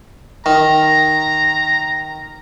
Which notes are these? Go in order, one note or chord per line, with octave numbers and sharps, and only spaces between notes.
D#3 A#5